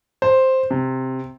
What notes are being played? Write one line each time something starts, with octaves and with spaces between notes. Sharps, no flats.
C5
C3